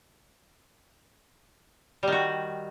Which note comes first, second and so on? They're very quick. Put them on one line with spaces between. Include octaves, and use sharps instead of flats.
G3 D#3 F#4